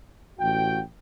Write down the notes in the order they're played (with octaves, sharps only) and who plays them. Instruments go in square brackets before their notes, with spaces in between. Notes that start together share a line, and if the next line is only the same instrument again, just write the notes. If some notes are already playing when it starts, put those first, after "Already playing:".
[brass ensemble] A1 F#4 G5